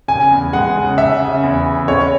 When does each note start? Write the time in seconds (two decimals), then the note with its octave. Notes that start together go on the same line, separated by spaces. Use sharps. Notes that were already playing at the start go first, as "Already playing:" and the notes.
0.08 C#3 G#5
0.31 E2
0.53 G#3 F#5
0.76 C#3
0.98 C#3 E5
1.20 C#3
1.43 E2
1.66 C#3
1.88 E2 C#5